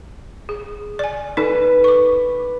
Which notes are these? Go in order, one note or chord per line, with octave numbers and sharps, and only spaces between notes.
G#4
D5 G#5
D#4 A4 B4
C#6 D6